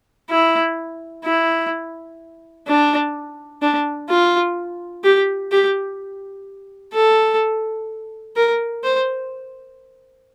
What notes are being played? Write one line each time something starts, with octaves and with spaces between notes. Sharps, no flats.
E4
E4
D4
D4
F4
G4
G4
A4
A#4
C5